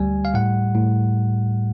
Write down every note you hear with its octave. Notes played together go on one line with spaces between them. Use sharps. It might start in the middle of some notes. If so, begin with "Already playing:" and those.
Already playing: D2 G3 G#5
F5
A2 F#5
A2